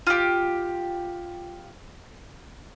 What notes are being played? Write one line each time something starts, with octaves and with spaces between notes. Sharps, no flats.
F4 G4